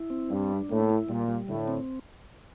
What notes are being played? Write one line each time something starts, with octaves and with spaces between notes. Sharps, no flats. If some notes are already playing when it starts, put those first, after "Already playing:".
Already playing: E4
C4
G2 G3
D4
A2 A#3
E4
A#2 G3
G3
A2 D3
C4